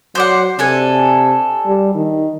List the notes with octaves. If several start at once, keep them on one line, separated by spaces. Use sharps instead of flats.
F#3 C5 D5 F#5
C3 D4 A4 G#5
G3
D#3